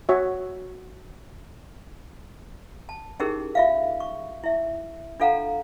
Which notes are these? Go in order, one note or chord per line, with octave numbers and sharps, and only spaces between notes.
F#4 C#5 E5
A5
C#4 D#4 E4 G4 G#4 A#4
F4 E5 F5
C#6
E4 E5
D4 F4 A4 F5 F#5 A#5